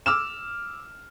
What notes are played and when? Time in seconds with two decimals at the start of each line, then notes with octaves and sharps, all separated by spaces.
0.06 D6 E6 F6 E7